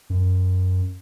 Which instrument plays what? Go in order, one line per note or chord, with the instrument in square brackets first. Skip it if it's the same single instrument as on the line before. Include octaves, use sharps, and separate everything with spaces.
[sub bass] F#2